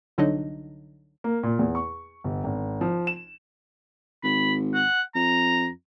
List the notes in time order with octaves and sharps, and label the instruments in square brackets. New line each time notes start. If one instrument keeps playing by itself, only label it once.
[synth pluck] C2 D3 F#3 D4 D#4 D#5
[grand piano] A#3
A#2
E2
C#6
G1
G#1
F3
E7
[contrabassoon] G#1 [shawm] B5
[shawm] F#5
[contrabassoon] F2 [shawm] A#5